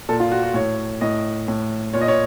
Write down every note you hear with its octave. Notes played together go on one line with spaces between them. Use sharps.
A#2 A4
F4
F#4
F#4
A2 C#5
A2 D#5
A2
A#2 C#5
D#5
C#5